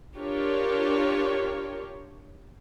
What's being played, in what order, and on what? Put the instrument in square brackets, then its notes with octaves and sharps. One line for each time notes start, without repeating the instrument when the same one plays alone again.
[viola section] D4 F4 G4 A#4 C#5